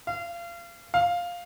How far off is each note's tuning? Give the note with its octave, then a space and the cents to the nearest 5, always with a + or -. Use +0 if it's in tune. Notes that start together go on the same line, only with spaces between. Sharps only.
F5 -30
F5 +5